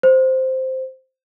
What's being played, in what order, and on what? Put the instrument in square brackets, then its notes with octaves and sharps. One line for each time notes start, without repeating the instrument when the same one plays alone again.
[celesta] C5